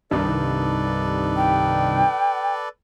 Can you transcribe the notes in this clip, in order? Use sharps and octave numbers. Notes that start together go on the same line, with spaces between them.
C2 G2 D#3 A4 B4 D5
G5